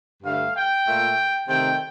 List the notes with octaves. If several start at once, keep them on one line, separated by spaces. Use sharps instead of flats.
G2 D3 A3 F5
G5
A#2 A3
C3 D#3 A3 G5